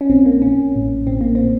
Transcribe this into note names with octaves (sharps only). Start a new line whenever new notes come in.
C#4
A#1 A#2 C4
A#3
A#1 A#2 C#4
A1 A2
A1 A2 C4
A#3
C4
A2